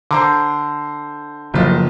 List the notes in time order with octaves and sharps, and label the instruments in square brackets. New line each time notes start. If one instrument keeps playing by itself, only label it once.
[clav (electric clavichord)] D3 [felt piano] C5 A#5 D6
[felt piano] F#1 F4 D#5 [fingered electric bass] C#3 F3 F#3